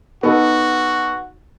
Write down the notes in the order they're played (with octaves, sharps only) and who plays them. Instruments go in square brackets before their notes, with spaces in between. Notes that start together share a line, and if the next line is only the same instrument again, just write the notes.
[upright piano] B3 D#4 A4 [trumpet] F#4